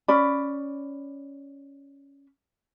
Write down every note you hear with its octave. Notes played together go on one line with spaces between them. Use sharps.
C#4 D5 B5